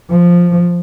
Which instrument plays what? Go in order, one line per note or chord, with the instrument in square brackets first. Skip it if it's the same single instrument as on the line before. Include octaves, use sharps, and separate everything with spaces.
[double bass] F3